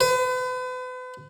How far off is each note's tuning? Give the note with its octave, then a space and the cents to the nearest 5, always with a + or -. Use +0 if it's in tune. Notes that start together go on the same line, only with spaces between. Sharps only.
B4 +40